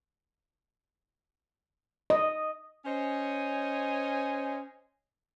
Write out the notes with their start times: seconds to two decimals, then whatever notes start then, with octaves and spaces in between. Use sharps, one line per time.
2.10 D#5
2.85 C#4 C5 C#5 D#5 G#5